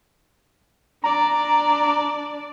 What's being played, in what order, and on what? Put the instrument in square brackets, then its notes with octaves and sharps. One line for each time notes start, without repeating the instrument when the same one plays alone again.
[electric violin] D4 D5 [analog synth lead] A#5